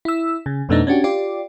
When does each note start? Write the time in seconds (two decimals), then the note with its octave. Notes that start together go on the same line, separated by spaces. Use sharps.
0.05 E4 E6
0.46 C#3
0.69 F2 B2 A3 B3 D4 D#4
0.87 C#4 D4 F#4 G4
1.04 F4 G4 D5